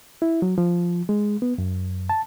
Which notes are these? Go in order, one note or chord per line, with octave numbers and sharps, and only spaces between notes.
E4
F#3
F3
G#3
B3
F#2
A5